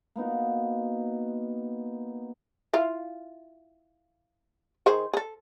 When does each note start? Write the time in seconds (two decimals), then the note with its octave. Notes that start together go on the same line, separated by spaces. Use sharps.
0.16 A#3 B3 D#4 F#4
2.73 E4 F4 F5
4.86 D#3 G#4 C5
5.13 G#4 A4